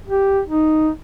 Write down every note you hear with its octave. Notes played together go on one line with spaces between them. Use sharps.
G4
D#4